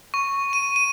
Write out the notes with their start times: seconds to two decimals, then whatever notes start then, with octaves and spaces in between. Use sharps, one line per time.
0.14 C#6
0.53 D#7
0.76 D#7